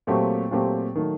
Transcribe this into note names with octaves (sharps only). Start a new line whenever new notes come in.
A#2 F#3 A3 C4 G4
A#2 F#3 A3 C4 G4
D#3 F#3 A3